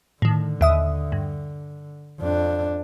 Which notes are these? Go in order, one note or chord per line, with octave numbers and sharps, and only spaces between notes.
A2 D3 D#3
D#2 E5 D#6
G2
F2 D4